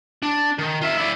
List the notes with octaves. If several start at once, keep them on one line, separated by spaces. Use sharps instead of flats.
D4
D#3
F4 E5
E4 D5